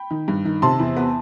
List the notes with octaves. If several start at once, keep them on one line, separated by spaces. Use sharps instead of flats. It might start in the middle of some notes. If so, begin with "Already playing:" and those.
Already playing: G5 B5
D#3
G2
D#3
C3 A5 C6
E2
B3